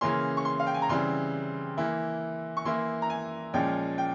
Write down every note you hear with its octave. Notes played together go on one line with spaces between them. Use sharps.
C#3 E3 A#3 C#4 C6
C#6
C6
F5
G5
G#5
A#5
C#3 E3 G3 C4 C6
E3 A#3 E4
C#6
E3 A#3 E4 C6
A#5
G#5
A#2 F3 G#3 C#4 G5
G5